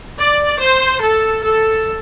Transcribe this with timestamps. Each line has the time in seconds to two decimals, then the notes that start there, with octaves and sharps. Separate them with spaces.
0.20 D5
0.61 C5
1.03 A4
1.44 A4